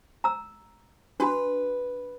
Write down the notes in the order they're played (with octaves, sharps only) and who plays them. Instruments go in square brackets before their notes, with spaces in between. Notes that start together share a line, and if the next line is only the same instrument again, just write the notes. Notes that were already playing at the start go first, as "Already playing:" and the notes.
[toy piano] A#5 E6
[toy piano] D4 F#4 B5 [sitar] B4